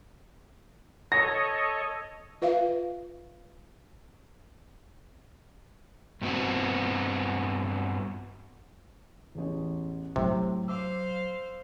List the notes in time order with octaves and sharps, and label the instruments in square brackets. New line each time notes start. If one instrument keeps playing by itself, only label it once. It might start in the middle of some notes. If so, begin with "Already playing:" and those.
[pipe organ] A4 C#5 D#5 [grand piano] A#6
[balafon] F4 B4 E5 F5
[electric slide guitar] G2 B3 C4 F#4
[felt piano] A1 E2
[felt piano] A2 [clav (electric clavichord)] C3 [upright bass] F#3
[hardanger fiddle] C5 F5 [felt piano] D6 E6